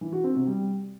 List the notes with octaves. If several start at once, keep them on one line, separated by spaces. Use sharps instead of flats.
E3
F#4
C4
C3
G3